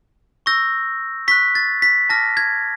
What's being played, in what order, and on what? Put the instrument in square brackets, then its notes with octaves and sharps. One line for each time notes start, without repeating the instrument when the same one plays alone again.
[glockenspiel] C#6 E6 G6 A#6
C#6 F#6 B6
A6
B6
A5 D6 F6 A#6
G#6